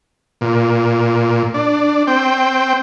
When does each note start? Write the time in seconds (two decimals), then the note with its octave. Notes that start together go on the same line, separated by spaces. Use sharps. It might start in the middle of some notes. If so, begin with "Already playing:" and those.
0.41 A#2
1.54 D4
2.07 C4 G5